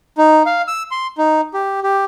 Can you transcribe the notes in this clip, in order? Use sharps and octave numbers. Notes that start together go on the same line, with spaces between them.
D#4
F5
E6
C6
D#4
G4
G4